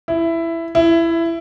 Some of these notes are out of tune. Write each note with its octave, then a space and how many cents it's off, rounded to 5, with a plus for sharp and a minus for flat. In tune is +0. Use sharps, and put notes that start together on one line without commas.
E4 +10
E4 +15